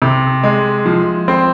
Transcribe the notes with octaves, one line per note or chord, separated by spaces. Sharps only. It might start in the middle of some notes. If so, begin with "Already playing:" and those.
C3
G#3
F3
C4